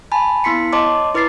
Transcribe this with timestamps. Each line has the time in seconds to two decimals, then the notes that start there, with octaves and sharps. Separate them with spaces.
0.12 G#5 A5 B5
0.44 B3 E4 C6 B6 C#7
0.73 C#5 D#5 A5 C6 D6
1.14 E4 B4 D6 A6 C7